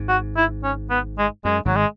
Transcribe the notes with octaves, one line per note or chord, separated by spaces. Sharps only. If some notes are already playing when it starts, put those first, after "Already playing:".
Already playing: G#1 G#2
F#4
E4
C#4
B3
G#3
F#2 G#3
G#1 G#2 F#3
G#3